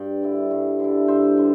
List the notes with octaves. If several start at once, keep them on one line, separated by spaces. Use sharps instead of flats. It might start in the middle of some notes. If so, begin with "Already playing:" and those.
Already playing: G2 D5 G5
D3 G3 E4
G2
D3 G3 E4
G2 C5 E5
D3 G3